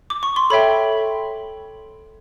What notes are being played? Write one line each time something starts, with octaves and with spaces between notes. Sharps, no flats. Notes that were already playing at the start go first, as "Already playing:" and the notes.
D6
C#6
C6
A4 C#5 E5 G5 B5